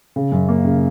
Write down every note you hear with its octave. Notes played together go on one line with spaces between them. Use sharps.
C#3
F#2
A#3
C#3